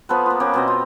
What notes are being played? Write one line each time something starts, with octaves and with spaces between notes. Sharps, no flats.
F3 B3 A4 B4
A#3 F4
A#3 B3 C#4 G4
B2 C4 D#5
F4